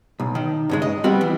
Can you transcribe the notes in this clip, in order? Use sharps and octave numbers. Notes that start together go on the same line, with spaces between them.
B1
D#3
G2 C#3 G#3
D#5
G3 B3 C4 F#4
E3